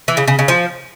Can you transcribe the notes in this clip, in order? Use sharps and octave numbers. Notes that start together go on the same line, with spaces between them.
E3
C#3
C#3
C#3
F3